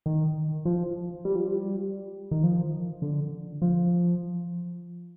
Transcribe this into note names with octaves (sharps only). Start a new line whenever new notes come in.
D#3
F3
G3
F3
G3
D#3
F3
D3
F3